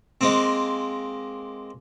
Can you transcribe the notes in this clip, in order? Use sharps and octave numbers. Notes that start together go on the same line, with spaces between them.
G#3 A#3 C4